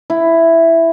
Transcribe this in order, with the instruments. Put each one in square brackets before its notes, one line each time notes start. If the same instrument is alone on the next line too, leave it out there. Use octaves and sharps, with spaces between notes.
[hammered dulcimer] E4